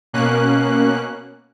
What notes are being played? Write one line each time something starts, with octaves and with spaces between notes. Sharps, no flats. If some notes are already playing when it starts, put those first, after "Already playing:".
B2 A#3 C#4 F#6